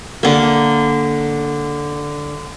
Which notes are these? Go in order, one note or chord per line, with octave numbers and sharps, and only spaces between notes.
D3 A#3